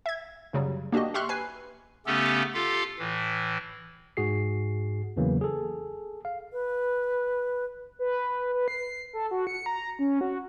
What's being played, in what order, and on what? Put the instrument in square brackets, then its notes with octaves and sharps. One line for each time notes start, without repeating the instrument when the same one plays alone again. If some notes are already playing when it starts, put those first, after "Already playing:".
[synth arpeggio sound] E5 G#6
F#2 C#3 F#3 G3
A#3 D4 F#4 G4 D#5
G4 E5 C6 C#6 F6 F#6
B4 G#5 C7
[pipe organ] C#3 A3 B3 C#4 G4 A4
F4 G4 A4 F5
A2 E3
[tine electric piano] G#2 F#4 G#4 C7
E2 C#3 E3 F#3 A#3
G#4 A4
F5
[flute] B4
[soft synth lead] B4
B4
C7
A4
F#4
C#7
A#5
C#4
F#4